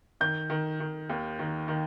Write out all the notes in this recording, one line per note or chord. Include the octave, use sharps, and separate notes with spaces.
D#3 G6
D#3
D#3
D#2
D#3
D#3